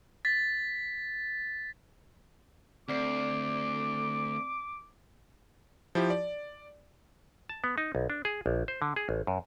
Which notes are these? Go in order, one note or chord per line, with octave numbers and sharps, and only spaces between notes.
A6 B6
D2 C4 D5 D6 C7
F3 E4 G4
D5
A5
B3
D#4
B1
D4
G#4
A#1
C5
D3
G#4
A1
F#2